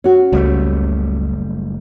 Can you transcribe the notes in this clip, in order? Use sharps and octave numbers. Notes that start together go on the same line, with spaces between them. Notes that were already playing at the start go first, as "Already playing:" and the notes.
C#4 F#4
F#1 C#2 G3 A3